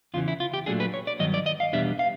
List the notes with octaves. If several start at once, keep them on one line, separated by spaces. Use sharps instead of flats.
E2 C#3 E3 F4
E4
F4
G4
A#2 F#3 A3 D4 G#4
B4
C#5
D5
G2 D#3 F#3 B3 D#5
D5
D#5
F5
E2 B2 G3 B3 D4 E5
F5